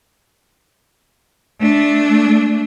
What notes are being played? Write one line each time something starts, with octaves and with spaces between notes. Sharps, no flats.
A3 D4